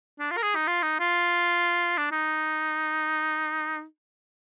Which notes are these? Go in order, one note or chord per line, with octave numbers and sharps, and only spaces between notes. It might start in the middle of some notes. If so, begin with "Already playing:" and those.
D4
F4
A#4
G#4
D#4
F4
D#4
F4
D4
D#4